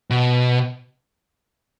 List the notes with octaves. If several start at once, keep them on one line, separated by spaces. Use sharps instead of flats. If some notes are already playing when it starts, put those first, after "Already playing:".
B2